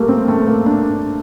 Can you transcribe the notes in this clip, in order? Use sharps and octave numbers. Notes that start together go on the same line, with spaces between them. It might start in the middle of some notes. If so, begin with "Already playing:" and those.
Already playing: G3 A3 A#3
C4
A3
A#3
D4